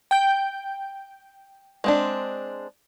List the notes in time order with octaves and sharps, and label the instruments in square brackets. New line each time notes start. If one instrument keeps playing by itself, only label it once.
[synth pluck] G5 G6
[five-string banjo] G#3 C4 D4